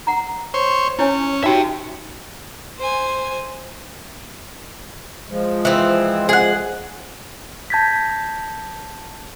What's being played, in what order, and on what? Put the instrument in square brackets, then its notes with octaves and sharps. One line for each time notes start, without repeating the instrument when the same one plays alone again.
[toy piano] F#5 A#5
[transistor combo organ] C5 C#5
[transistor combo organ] C#4 [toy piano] E4 C#5 G#5
[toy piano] D#4 F#4 G4 [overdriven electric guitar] E5 G5
[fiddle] C5 G#5
[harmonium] F3 G#3
[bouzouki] E3 C4
G#4 F#5
[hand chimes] A5 G6 G#6 A#6 B6